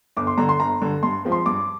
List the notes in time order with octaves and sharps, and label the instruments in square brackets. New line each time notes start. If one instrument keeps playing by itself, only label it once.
[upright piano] G1 D6
C6
G2 D3 A#5
C6
G1 A#5
G2 D3
G2 C6
F3 G#3 C4
C6
G2 D6